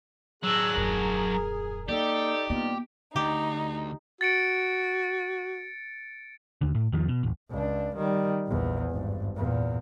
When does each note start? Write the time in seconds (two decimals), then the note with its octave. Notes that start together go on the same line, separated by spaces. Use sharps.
0.43 F#3 D4 G#4 E6 F#6
0.77 D#1 F#2 A#4
1.89 A#3 D#4 G4 A4 D5
2.50 G2 A#3 B3 F4 D5
3.16 D2 D#4 G4
4.21 F#4 A6 C#7 D7
6.61 D#2 D3
6.75 A2
6.92 E2 D#3 F3
7.08 B2
7.23 D#1 A1
7.50 C#2 D4
7.95 D#3 G3
8.46 A#1 E2
8.90 G#1 G2
9.36 E2 A#2